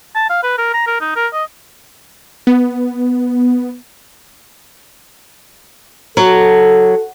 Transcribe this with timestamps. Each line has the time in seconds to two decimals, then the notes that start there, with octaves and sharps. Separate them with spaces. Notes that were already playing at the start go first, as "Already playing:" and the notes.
0.15 A5
0.30 F5
0.43 B4
0.58 A#4
0.74 A#5
0.87 A#4
1.01 D#4
1.16 A#4
1.34 D#5
2.47 B3
6.17 F#3 A4